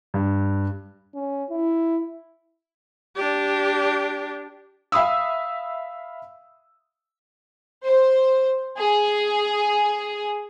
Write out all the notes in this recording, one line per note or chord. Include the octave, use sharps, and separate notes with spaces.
G2
C#4
E4
D4 G4
E5 F5 B5 D#6 E6
C5
G#4